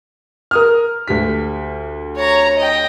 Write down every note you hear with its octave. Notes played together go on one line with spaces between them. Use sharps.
A#4 D#6 F6
D2 G4 B6
C#5 A#5
D#5 G5